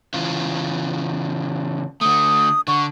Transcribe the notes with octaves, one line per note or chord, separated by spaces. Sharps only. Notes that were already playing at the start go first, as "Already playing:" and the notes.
C#3 E3 F4
D3 A3 D#6
D3 C#6